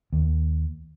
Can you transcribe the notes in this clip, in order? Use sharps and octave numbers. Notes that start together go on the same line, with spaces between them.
D#2